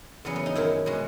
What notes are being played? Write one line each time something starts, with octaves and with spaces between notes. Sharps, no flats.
E2 C#3 F#3 B3
B3
D#4
F#2 D#3 F#3 E4
B2 G#3 F#4